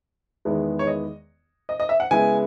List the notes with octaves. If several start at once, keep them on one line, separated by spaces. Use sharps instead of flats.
E2 D#3 G#3 B3 E4
C#5
D#5
D#5
D#5
E5
F#5
C#3 G#3 B3 E4 G#5